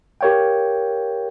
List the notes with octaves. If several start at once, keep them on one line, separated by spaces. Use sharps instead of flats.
G4 A#4 C#5 F5 G5